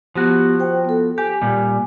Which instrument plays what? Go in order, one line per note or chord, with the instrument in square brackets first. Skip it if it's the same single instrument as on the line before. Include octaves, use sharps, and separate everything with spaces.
[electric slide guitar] F3 F#4 [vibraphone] B3 G4
[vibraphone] C5 G5
B3 A4
[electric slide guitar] G4 [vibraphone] G#5
[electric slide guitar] A#2 G3